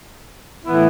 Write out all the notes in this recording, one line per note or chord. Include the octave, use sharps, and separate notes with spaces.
A2 E3 B3 E4